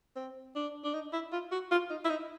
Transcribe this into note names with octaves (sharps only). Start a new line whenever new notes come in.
C4
D4
D4
D#4
E4
F4
F#4
F4
D#4
E4
D#4